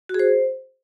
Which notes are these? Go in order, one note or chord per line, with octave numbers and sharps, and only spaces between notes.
F#4
G#4
C5